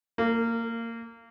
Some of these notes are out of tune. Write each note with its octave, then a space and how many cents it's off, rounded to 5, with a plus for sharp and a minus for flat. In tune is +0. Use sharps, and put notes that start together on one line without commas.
A#3 -20